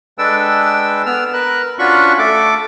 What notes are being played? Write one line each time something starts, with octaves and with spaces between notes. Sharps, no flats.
G#3 D4 A4 B4 G5 E6
B3 E6 F6
A#4 B4 F#6
C#4 D4 F4 F#4 B5 C#6
A3 A4 D6